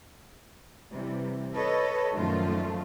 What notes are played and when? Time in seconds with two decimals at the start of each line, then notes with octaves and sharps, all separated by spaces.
0.91 C3 E3 G3
1.56 A4 B4 C#5 D#5
2.15 F#2 A#2 D#3 F3 A3 F4